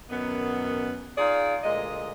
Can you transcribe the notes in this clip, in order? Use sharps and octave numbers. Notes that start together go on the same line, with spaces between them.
F#2 D#3 B3
D#4 F4 G#4 D5 F5
D2 A#2 G#3 D#5